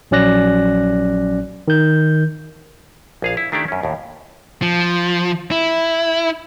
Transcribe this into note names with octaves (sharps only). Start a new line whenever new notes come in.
A#1 F#3 C#4 D5 F#6 A#6
D#3 G6
A#1 G#4 F5
E4
D#3 A3 D4 E4 G4 D5
F#2 C#4
D#2 A2
F3
E4